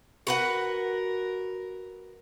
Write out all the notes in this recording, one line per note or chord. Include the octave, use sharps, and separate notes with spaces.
F#4 A#4 B4 F#5